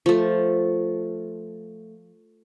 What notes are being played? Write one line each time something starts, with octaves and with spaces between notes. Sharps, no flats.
F3 A3